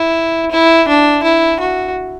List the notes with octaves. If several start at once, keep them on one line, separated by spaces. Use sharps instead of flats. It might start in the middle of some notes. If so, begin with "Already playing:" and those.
Already playing: E4
E4
D4
E4
F#4